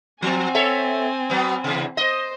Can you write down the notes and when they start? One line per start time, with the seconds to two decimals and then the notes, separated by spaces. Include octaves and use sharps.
0.22 F3 C4 G#5
0.55 A4 C#5 E5
1.30 F#3 B3
1.64 E2 C3
1.97 C5 D#5